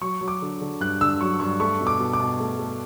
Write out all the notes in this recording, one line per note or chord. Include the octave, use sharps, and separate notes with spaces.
F#3 C#6
F#3
D6
D3
D3
G2 F#6
D3 E6
F#3 C#6
G2 C#6
A3 C#6
B2
D6
B2
D6
B2
A3
A3